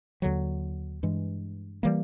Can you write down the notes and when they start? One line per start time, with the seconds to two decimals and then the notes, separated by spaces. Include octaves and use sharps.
0.22 D#2 D3 F#3
1.03 G2 E3 G#3
1.83 E3 G3 A#3